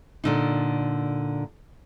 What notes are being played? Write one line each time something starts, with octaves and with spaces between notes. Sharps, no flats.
A#2 D3 D#4